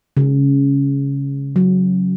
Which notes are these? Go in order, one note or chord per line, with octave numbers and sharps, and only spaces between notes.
C#3
F#3